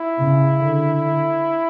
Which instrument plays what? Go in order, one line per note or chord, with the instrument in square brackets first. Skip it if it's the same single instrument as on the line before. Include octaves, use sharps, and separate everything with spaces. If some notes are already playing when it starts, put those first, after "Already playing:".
Already playing: [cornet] E4
[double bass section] C#3
D3